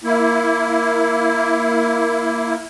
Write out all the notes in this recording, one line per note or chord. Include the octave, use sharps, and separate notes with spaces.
A#3 E4